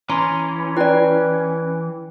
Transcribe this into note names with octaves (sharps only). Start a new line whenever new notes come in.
E3 C#4 A#5 C6
E4 B4 D5 G5